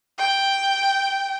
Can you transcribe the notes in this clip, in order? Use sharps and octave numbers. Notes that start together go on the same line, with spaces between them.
G5